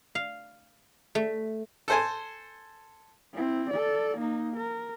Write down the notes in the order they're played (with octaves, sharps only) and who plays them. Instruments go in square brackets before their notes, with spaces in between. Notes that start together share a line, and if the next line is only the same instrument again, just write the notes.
[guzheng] F5
A3
[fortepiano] A4 C5 G#5
[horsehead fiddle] C4 E4
A4 D5
A#3 D#4
A#4